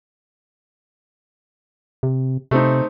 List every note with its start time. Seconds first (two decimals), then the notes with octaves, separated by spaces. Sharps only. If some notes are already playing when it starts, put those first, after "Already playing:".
2.03 C3
2.51 C3 A3 C4 D#4